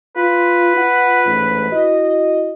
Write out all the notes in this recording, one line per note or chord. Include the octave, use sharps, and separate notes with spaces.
F4 B4
F4 F#5
A1 G#2
E4 F#4 D#5